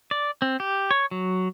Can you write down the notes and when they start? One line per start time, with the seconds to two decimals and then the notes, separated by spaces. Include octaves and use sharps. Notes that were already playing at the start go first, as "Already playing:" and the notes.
0.11 D5
0.42 C4
0.60 G4
0.91 C#5
1.11 F#3